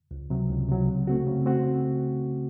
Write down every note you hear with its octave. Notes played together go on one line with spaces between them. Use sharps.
C#2
C3 F#3
C#2
C3 F#3
C#3
A3 C4 F#4
C#3
A3 C4 F#4